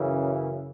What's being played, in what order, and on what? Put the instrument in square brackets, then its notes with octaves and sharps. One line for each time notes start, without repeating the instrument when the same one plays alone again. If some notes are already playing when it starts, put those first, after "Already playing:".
Already playing: [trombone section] F#2 C#3 E3